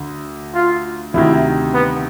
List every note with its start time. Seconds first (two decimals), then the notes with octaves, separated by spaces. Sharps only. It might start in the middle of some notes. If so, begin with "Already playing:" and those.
Already playing: D2 D3
0.54 F4
1.14 D2 C3 D#3 E4
1.74 B3